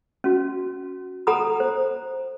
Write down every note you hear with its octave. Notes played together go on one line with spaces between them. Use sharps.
C#4 F#4
A4 F#5 A#5 B5 D#6
C5